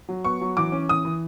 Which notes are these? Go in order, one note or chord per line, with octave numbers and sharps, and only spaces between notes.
F#3
B3 C#6
F#3
E3 D6
C#4
E3 D#6
E3